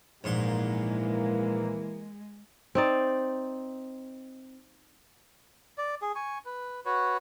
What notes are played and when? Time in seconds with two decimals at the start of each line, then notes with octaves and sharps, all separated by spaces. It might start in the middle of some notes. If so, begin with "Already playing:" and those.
0.24 A#1 G#2 E3 G#3 A#3 C6
2.75 C4 D#4 D5
5.78 D5
6.02 G#4
6.15 G#5 C#6
6.45 B4
6.85 F#4 B4 C#5